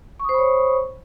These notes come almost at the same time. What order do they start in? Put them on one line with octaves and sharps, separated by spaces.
C#6 D#6 C5 B5 C#5